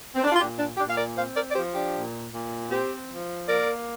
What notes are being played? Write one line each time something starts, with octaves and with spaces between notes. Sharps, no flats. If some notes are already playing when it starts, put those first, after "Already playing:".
C4
D4
F4
A#2 D4 G4
D4
A#2 D4 G4
F5
A#4 D5
C4 C5 F5
A#4 D5
D5
F3 G4 C5
D4 G4
A#2
A#2
C4 G4 C5
F3
A#3 A#4 D5